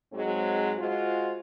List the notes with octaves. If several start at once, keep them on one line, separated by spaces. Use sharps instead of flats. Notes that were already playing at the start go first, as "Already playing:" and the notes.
G#2 F#3 G#3 C4
G#3 F4 F#4 C5